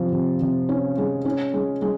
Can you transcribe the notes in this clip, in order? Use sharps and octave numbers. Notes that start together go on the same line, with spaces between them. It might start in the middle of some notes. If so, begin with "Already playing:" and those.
Already playing: C3 F3
C3
C3
C#4
G#3
C#4
G#3
G#3